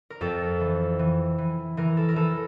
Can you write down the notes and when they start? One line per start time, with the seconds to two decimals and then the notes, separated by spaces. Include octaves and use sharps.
0.10 A#4
0.21 F2 A4
0.61 E3
0.99 E3
1.38 E3
1.77 E3 A#4
1.97 A4
2.09 A#4
2.16 E3 A4